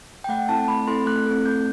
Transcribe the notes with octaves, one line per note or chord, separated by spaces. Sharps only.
G5
A3 F#5
C4 E4 A4 A5
A3 B5
C4 E4 A4 C6
A3 F#6
C4 E4 A4
A3 G6